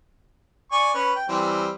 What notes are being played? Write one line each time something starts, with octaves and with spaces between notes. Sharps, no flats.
D5 G#5 C#6
C#4 B4
G5
E3 G3 C4